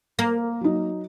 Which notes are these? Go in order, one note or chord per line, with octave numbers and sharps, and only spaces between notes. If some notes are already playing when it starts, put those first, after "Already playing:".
A#3
F#3 D#4